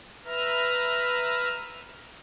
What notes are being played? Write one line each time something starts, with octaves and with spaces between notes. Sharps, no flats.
B4 E5 A#5 F6